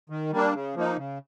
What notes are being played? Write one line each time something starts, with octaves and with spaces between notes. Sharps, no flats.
D#3
G3 A#3 D4
C#3
F3 A#3 D#4
C#3